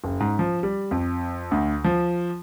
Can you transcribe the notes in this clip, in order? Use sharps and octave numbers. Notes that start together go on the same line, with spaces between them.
F#1
G#2
F3
G3
F2
D2
F3